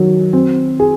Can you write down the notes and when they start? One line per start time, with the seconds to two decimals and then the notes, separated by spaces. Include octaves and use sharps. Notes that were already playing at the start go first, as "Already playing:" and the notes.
Already playing: D#3 F#3
0.33 C4
0.80 G#4